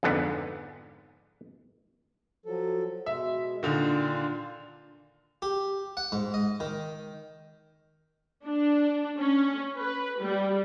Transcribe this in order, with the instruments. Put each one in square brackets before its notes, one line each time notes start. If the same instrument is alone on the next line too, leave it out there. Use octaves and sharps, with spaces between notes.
[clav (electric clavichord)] F2 G#2 D3 B3
[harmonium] F3 F#3 A4
[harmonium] B2 G#3 [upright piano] E5
[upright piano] A#2 D3 D#3 [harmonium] D4 F4
[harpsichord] G4
F#5
G#2
D#5
D#3
[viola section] D4
C#4
B4
G3